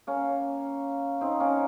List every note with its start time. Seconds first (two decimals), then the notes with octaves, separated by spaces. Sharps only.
0.07 A#3 C#4
1.21 C4 D#4
1.40 A#3 C#4